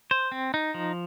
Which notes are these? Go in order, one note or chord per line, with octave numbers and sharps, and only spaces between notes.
C5
C4
D#4
F3